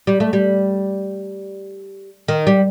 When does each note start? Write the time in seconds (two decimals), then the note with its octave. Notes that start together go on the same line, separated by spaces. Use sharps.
0.07 G3
0.20 A3
0.33 G3
2.28 D#3
2.47 G3